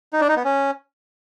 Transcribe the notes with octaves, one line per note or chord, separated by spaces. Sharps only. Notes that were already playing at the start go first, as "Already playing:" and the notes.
D#4
D4
D#4
B3
C#4